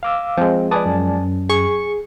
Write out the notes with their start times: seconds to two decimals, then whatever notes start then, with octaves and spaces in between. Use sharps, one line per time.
0.03 F5 D6 E6
0.37 F3 G#3 C4
0.71 B4 D5 G#5 A5 D6 D#6
0.86 F#2
1.49 G#4 C#6